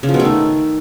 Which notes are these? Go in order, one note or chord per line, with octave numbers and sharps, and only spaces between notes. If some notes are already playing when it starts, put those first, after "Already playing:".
C#3
F3
B2
A3
D#3